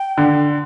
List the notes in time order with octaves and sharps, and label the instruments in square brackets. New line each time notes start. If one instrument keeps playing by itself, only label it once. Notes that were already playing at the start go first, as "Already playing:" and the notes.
Already playing: [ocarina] G5
[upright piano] D3